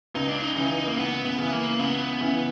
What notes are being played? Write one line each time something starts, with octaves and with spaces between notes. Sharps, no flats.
C#2 D#4
D4
D#4
C#3 E3 D#4
A#3
C#2 B3
B3
C#3 E3
A#3
C#2 B3
C#3 E3